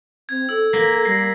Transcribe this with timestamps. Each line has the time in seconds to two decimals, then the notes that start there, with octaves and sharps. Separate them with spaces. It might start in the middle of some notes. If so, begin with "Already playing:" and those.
0.29 C4 G#6
0.49 A4 E6
0.73 A#3 B6
1.05 G3 A#6 C7